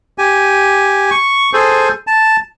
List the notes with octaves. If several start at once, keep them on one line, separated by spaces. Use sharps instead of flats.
G4 G#5
C#6
G#4 A4 C5
A5